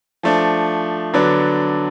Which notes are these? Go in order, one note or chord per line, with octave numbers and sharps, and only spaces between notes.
F3 A3 D4
D3 F#3 B3 D4